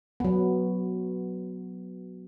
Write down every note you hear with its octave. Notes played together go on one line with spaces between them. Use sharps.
F#3 B3